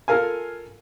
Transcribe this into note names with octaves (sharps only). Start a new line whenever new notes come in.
F4 A4 A#4 F5 G#5